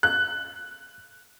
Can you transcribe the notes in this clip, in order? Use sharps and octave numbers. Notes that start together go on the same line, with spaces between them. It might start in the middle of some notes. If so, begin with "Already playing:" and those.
F#6